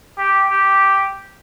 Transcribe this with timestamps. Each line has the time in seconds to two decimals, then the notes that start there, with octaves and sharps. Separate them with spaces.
0.18 G4
0.51 G4